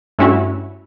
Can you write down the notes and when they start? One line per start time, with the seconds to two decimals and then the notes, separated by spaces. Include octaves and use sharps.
0.19 G2 A3 C#4 E4 F#4